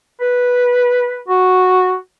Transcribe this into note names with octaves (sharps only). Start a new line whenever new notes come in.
B4
F#4